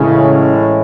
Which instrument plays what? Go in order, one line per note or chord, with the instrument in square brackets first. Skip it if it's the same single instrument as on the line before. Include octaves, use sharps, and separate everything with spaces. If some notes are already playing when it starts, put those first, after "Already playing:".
Already playing: [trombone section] A1 A2 G#3 C#4 E4 [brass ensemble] C#3